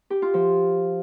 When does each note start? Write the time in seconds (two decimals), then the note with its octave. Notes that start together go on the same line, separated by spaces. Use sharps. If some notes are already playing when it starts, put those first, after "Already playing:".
0.10 G4
0.22 F4
0.34 F3